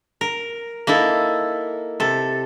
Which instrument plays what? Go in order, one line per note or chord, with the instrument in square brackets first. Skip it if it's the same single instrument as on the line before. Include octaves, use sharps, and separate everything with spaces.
[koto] A#4
A#3 D#4 E4 A4
C3 A4